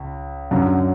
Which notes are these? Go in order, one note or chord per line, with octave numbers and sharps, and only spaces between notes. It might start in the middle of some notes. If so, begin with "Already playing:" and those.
Already playing: C#2
F#2 D3 F#3 F#5